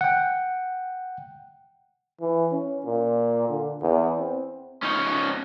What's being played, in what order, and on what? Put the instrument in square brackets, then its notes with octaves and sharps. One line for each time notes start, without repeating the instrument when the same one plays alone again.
[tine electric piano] F#5 G5
[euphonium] E3
C#4
A#2
D3
E2
C4
[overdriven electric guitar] C#4 D#4